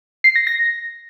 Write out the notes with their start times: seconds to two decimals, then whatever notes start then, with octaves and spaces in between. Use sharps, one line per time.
0.24 C7
0.36 A#6
0.47 A#6